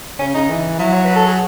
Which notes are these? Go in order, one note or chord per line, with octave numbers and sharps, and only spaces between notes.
C#3 C#4
C#3 D#4
E3
F#3 E4
C#5
B4
A4
G#4